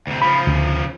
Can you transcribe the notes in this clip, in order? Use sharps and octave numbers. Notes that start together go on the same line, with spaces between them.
D2 C3
C#3 F3 B5
D2